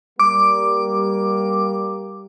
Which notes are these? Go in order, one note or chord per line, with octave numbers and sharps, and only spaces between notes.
G3 A#3 D6